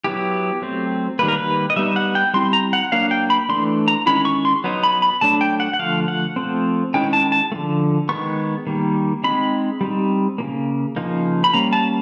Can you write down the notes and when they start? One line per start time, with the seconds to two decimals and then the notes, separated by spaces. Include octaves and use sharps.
0.04 F#3 B3 E4 G4
0.62 F#3 A3 C4
1.19 D#3 G3 A#3 B4
1.28 A#4
1.38 B4
1.70 D#5
1.76 G3 B3 D#4 E5
1.96 F#5
2.15 G5
2.34 G3 C4 E4 C6
2.53 A#5
2.73 F#5
2.92 F#3 A#3 D4 F5
3.11 G5
3.30 B5
3.49 E3 A3 D4 C6
3.88 A#5
4.06 D#3 G#3 C#4 E4 B5
4.25 C#6
4.45 C6
4.64 F#3 B3 D#4
4.83 B5
5.02 B5
5.21 F#3 A3 D4 A5
5.41 G5
5.60 F#5
5.74 F#5
5.79 D3 F3 A3 F5
6.08 F#5
6.36 F3 A3 C4
6.94 D#3 G#3 C#4 E4 G5
7.13 A5
7.32 A5
7.52 D3 F3 A3
8.09 D#3 G#3 B3 C#6
8.67 D#3 G3 A#3
9.24 G#3 C4 D#4 B5
9.81 G3 C4 D#4
10.38 C#3 F3 A#3
10.96 C#3 F3 A#3 D#4
11.44 B5
11.53 G3 A#3 C#4 A#5
11.73 A5